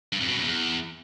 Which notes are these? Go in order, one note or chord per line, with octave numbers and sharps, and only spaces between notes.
G2
F2
B2
F#2
E2